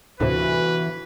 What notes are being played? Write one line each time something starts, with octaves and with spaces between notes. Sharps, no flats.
G1 D2 A2 C3 E3 F#4 B4